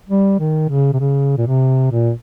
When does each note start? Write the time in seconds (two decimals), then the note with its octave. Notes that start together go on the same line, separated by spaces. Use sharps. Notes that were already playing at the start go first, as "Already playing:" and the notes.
0.09 G3
0.40 D#3
0.70 C#3
0.93 C3
1.00 C#3
1.38 A#2
1.47 C3
1.92 A#2